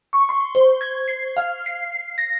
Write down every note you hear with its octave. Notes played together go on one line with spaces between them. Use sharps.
C#6
C6
C5
G#6
C7
F5
C7
A#6